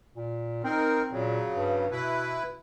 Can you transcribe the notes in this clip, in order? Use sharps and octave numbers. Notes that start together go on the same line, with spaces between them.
A#2
C4 D#4 A#4
A#2 C#3 F#3
G2
B2 E4 B4